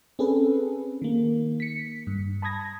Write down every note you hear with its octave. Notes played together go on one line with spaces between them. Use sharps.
C4 C#4 G#4 A4 B4
D#3 A#3
B6 C#7
G2
A5 B5 D#6 G#6 A#6